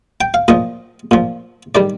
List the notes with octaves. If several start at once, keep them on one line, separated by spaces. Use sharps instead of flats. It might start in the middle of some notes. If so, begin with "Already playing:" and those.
G5
F5
A#2 F3 D#5
A#2 F3
D#3 G3 D5